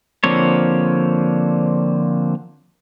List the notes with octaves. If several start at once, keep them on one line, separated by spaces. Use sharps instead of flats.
D3 F3 A#3 C4 C#5